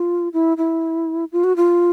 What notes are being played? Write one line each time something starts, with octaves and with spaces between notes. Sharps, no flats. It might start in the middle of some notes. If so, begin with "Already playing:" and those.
Already playing: F4
E4
E4
F4
F#4
F4